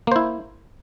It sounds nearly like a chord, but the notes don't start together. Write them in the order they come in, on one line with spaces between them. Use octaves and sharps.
A#3 C5 E4